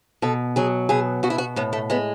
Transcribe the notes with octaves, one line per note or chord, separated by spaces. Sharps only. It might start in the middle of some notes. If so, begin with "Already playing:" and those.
B2 A4
F#3 G#4
B2 G#4
B2 F#4
E4
F#4
A2 B3
A3
G#3 B3